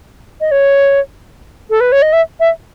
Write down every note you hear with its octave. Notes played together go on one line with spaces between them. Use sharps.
D#5
C#5
A4
B4
C#5
D#5
E5
E5